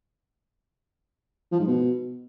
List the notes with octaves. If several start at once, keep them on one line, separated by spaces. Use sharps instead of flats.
F3
G#2
B2